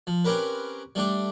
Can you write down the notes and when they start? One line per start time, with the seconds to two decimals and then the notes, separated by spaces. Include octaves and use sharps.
0.07 F3
0.25 C4 C#4 G4 A#4 B4
0.95 G3 A3 D4 G4